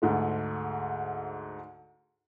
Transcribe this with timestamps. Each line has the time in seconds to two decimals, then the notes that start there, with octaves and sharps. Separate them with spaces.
0.02 D2 G#2 A3